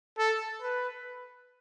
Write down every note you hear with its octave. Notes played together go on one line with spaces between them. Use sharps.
A4
B4